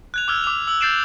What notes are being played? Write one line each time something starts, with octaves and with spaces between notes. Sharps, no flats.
F#6 G#6 F7
D6 E6 F6 G#6
D6 F7
E6 F#7
G6 A6 C7 D7 E7